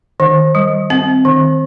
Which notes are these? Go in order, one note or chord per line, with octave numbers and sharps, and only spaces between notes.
D#3
G3
C4
D#3